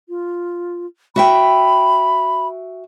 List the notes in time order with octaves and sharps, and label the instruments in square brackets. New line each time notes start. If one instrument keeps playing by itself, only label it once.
[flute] F4
[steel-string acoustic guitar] F#4 E5 G5 [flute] B5